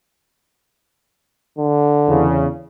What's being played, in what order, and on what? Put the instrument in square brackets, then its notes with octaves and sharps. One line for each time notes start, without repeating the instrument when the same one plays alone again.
[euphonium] D3
[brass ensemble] E2 C#3